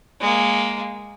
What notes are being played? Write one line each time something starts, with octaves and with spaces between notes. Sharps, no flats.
G#3 A#3